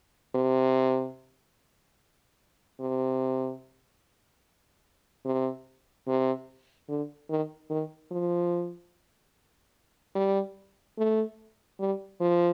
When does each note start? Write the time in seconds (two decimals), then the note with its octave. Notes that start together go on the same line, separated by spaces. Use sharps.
0.35 C3
2.80 C3
5.25 C3
6.07 C3
6.89 D3
7.29 D#3
7.70 D#3
8.11 F3
10.15 G3
10.98 A3
11.80 G3
12.20 F3